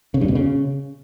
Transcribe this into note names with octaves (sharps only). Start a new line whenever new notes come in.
C#3
G2
B2
C#3